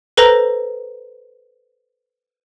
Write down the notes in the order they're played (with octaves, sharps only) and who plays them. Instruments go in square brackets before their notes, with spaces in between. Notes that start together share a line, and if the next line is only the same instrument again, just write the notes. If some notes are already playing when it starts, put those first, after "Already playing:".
[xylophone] A4 B4 C5 A#5 A#6